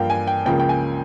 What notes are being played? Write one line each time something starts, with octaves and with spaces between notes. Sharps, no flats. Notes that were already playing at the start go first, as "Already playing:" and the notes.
Already playing: G2 F3 A#3 F5 G5
G#5
G5
C#2 C#3 F3 A#3 G5
G5
G#5